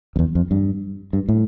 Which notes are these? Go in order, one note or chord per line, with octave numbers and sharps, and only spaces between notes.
F2
E2
F2
G2
G2
A2